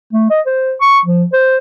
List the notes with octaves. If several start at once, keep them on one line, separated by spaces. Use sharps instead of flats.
A3
D#5
C5
C#6
F3
C5